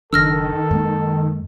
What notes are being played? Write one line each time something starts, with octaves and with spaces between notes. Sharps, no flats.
F#1 D#3 D4 A4 E6 F6 A#6
F#2 G#3 A#3